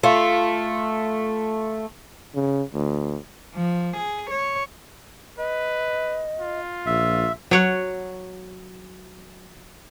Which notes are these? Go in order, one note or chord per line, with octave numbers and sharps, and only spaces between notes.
A3 F4
C#3
D2
F3
G#4
C#5
B4 D#5
F4
A#1 E5
F#3 C#5 F#5